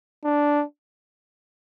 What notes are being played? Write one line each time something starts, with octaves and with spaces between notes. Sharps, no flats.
D4